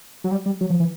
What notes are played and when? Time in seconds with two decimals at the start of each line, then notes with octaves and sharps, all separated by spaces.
0.24 F#3
0.31 G3
0.46 G3
0.61 F#3
0.70 F3
0.80 E3